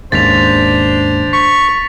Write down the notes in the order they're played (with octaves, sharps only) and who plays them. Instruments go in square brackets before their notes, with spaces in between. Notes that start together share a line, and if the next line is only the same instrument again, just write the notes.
[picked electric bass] D#2 G#2 C#3 [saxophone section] D4 C5 [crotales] A6 B6 F7
[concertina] C#6 [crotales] B6